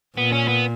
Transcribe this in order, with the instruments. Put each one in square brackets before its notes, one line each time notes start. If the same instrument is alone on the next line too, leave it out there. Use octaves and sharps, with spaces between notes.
[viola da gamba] A#2 [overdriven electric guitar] B3
[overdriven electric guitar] C#4
B3